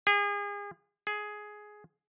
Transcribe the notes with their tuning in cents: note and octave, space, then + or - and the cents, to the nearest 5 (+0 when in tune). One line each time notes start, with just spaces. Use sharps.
G#4 -35
G#4 +10